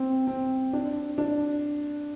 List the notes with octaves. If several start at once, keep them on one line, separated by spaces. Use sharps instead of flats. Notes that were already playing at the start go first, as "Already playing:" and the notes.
Already playing: C4
C4
D4
D4